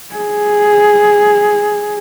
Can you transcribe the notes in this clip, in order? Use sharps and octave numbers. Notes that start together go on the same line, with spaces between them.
G#4